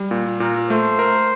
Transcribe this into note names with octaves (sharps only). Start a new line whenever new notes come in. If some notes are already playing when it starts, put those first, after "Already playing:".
Already playing: G3
A#2
A#2 A#4
A3 C5
A#4